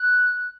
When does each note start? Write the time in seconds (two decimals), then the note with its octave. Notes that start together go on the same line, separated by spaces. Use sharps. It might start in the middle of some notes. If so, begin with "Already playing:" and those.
Already playing: F#6